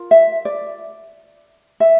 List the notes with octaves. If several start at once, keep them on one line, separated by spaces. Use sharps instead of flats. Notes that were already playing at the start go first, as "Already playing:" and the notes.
Already playing: F4 A#4
E5
D5
E5